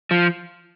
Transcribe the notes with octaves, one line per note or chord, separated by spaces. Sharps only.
F3